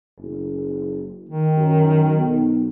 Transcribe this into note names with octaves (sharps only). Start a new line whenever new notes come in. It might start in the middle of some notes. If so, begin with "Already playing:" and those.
F#1
D#3
F#2
B1